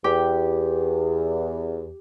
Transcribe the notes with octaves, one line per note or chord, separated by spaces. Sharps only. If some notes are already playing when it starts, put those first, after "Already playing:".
E2 G4